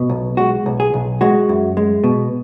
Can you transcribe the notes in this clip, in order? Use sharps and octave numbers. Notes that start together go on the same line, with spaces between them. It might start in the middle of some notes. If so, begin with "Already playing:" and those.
Already playing: B2
B1
G#3 F#4
B1
G#4
B1
G#3 F#4
F#2
G#3
B2